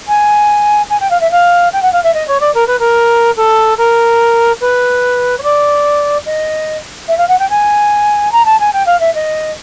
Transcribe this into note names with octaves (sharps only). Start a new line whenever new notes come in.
G#5
G#5
G5
F5
E5
F5
G5
F#5
F5
E5
D#5
C#5
D5
A#4
B4
A#4
A4
A#4
B4
C#5
D5
D#5
E5
F5
F#5
G5
G#5
A#5
A5
G#5
G5
F5
E5
D#5